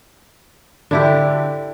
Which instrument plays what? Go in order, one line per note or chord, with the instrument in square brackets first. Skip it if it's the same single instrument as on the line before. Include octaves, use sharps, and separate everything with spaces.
[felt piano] D3 [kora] D4 E4 G4